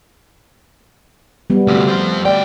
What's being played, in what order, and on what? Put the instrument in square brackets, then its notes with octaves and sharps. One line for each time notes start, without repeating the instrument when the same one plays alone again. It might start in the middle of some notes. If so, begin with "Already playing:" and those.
[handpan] G3 B3
[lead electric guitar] D2 C3 [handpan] A3
[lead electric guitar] F2 C5
[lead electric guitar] D2 G5 [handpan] D5